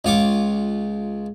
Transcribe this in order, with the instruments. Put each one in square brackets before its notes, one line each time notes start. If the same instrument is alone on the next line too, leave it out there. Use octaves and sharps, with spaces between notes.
[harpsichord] C#2 F4 C#6 D6